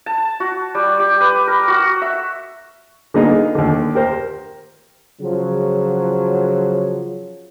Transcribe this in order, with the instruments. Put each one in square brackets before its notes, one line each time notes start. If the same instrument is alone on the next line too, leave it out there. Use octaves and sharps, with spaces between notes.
[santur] A5
F#4
G3
G4
B4
A#4
F#4
E5
[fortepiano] D3 A#3 B3 D#4 G#4
D#2 D3
G4 A#4 C5
[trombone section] C#3 F3 F#3